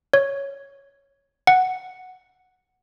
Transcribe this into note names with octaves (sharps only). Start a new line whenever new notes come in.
C#5
F#5